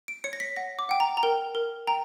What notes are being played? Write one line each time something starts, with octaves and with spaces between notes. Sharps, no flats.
D7
C#5 C#7
A#6
B6
F#5 A#6
D6
F#5 G5
A#5
A#5
A#4 G5
A#4
G5 A#5